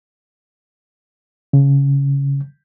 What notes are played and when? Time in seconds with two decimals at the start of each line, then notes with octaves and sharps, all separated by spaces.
1.53 C#3